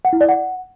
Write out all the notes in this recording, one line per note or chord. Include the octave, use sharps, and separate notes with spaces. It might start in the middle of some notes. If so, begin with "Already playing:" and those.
F#5
E4
D5
F#5